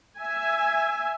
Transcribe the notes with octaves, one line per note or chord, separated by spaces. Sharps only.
E5 G#5